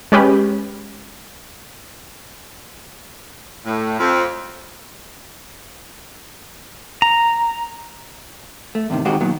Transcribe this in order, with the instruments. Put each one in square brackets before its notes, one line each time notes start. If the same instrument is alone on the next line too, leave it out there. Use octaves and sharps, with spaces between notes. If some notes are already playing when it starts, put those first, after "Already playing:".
[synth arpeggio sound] G#3 C#4 G4 B4
[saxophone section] A2
F2
[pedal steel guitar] A#5
[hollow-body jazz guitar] A3
E2 A2 C3 D#3
D#3 G#3 C4 F#4 G4
A#2 D#3 F#3 B3